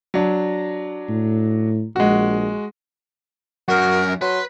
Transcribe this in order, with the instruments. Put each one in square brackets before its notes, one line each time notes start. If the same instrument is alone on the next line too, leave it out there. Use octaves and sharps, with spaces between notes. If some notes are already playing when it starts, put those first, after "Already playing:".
[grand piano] F#3 D4
[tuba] A2
[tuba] A#1 [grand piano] G#3 F#4
[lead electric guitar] F#2 [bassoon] F#4 [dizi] A#4
[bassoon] F#3 [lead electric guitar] B4 [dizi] C6